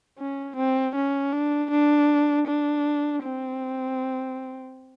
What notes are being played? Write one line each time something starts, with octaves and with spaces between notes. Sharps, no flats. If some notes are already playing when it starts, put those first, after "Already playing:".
C#4
C4
C#4
D4
D4
D4
C4